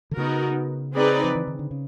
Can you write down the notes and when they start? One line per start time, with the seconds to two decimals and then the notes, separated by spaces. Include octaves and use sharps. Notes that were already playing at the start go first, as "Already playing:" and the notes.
0.11 D3
0.17 C#3 B3 D#4 F#4 A#4
0.94 C4 D#4 G#4 B4 D5
1.24 F3
1.35 E3
1.47 D#3
1.59 D3
1.71 C#3